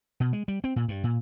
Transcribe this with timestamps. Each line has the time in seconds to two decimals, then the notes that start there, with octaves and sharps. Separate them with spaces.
0.20 B2
0.33 G#3
0.48 G3
0.64 C4
0.76 A#2
0.88 G2
1.04 A#2